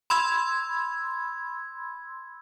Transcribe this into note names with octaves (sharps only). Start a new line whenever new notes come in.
B5 C6 E6 G#6